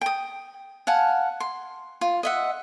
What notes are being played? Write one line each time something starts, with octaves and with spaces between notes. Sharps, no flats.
G5 D#6
F5 F#5 G#5 A5
C6
F4
D#5 E5 F#5